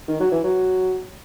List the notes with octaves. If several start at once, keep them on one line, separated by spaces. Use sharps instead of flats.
D#3
F#3
E3
F#3